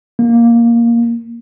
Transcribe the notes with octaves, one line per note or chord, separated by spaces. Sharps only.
A#3